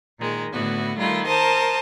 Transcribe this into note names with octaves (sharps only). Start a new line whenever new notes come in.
A#2 D#3 G#3
A2 D3 B3 E4 F#4
D#3 G3 A3 E4 F4
A#4 C5 A5 D#6